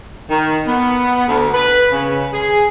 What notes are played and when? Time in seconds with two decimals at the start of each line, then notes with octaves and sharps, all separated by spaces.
0.30 D#3
0.67 B3
1.27 D2
1.53 B4
1.91 C#3
2.33 G#4